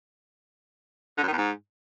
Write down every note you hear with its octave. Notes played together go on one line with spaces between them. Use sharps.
D3
F#2
D#3
E2
G#2